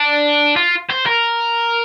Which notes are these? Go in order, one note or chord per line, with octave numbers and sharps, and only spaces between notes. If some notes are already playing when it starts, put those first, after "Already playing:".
Already playing: D4
F4
C5
A#4